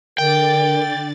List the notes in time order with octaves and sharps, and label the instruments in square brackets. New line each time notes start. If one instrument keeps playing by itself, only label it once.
[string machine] D3 D5 A6 [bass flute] A#4 [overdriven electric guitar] G5